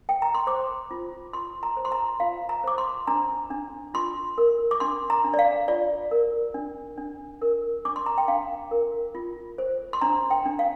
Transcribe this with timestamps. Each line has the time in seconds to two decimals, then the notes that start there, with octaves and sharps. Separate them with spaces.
0.09 G5
0.22 A#5
0.35 C6
0.47 C5 D6
0.91 F4
1.33 F4 C6
1.63 A#5
1.77 C5
1.85 C6
1.92 A#5
2.20 F4 F5
2.49 A#5
2.64 C5 D6
2.78 C6
3.07 D4 A#5
3.51 D4
3.94 F4 C6
4.38 A#4
4.71 D6
4.80 D4 C6
5.10 A#5
5.24 D4
5.34 D5
5.39 F5
5.68 F4 D5
6.11 A#4
6.54 D4
6.98 D4
7.42 A#4
7.85 D4 D6
7.96 C6
8.06 A#5
8.18 G5
8.28 D4 F5
8.71 A#4
9.15 F4
9.58 C5
9.93 C6
10.01 D4 A#5
10.31 G5
10.46 D4
10.59 F5